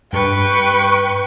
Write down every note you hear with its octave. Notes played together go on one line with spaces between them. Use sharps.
G2 B4 G5 C#6